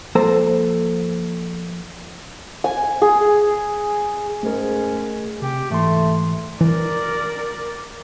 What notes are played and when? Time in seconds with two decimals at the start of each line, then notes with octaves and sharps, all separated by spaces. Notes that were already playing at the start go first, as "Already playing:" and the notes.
0.15 F3 A#3 A4 C5 A#5
2.64 G#5
3.02 G#4
4.43 G#2 A3 C#4 G#4 A#4
5.42 C3 G4
5.70 G#2 E3 A3 C6
6.61 E3 A#4 D5